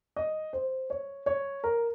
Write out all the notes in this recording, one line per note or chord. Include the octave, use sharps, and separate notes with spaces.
D#5
C5
C#5
C#5
A#4